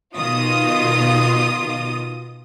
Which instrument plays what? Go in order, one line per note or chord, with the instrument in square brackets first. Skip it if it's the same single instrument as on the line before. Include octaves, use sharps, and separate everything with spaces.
[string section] B2 D#3 F4 D#6